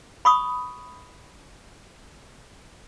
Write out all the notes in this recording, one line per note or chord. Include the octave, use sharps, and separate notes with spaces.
B5 C#6 D#6